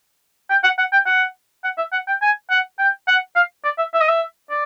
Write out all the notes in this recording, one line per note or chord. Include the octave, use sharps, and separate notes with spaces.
G5
F#5
F#5
G5
F#5
F#5
E5
F#5
G5
G#5
F#5
G5
F#5
F5
D5
E5
E5
D#5
E5
D5